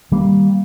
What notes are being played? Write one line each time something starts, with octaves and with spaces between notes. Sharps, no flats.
D#3 G3 A#3